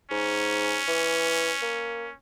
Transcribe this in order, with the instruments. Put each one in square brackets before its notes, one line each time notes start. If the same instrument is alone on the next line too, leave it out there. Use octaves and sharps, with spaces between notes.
[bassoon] G#2 [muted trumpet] C#4
[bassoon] E3
A#3